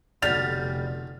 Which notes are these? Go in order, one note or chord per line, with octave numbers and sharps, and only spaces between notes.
F1 B1 B2 D3 G3 F6 A6 F7